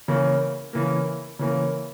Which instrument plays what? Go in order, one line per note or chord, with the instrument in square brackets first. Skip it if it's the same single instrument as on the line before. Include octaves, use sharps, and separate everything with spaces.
[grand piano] C#3 E3 A#3
C#3 E3 A#3
C#3 E3 A#3